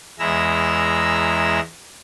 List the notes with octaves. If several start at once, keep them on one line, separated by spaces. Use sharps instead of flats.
E2 G#3 E4 A#5 E6